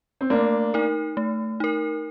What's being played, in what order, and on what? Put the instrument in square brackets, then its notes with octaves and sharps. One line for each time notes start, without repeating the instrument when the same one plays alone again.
[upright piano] C4
[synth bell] A3 [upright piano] A#3 D4
[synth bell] D#4 A#4
A3
D#4 A#4